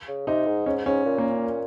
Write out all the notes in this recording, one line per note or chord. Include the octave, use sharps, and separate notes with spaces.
C#3
C3 D#4
G#2
G#2 C#4
G#2 C#4
A#2
A#3
C#4